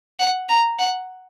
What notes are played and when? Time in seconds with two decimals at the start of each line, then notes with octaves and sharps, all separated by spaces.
0.20 F#5
0.49 A#5
0.79 F#5